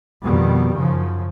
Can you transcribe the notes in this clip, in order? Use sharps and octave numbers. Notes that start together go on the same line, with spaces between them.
F2 B2 D#3 G3
F#2 C#3 F3